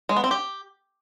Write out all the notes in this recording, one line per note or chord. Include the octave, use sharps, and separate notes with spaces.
G#3
B3
C4
G4